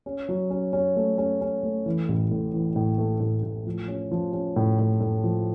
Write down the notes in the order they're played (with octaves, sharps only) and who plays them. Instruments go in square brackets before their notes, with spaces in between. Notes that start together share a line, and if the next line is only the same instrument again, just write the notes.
[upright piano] C#4
F#3
C#4
C#4
A3
C#4
C#4
A3
E3
A1
A2
E3
A2
A3
A2
A2
F3
C#4
F3
C#4
A2
A2
A2
F3